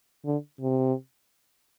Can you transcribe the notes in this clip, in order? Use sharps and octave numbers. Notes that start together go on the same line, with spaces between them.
D3
C3